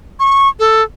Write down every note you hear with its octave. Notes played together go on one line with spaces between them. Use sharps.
C#6
A4